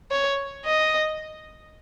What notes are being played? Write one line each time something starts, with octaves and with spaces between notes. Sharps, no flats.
C#5
D#5